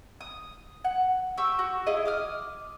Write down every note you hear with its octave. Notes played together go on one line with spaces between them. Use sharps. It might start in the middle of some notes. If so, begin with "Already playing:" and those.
D#6
F#5
G4 C#6 E6
F#4
E4 F4 G#4 D#5
D6 D#6 F6